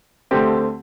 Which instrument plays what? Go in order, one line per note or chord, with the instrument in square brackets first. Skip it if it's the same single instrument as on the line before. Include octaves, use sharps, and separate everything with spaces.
[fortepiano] D2 D3 A3 C4 G4